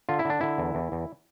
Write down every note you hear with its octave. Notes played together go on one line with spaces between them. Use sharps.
D3 F4
E4
D3 D4
D3 E4
E2
E2
E2